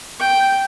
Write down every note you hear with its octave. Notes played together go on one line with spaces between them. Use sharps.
G5